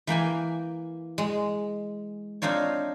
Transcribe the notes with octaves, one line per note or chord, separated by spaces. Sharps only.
E3 A#3 G5 G#5
G#3
C4 D4 D#4 F4 C#5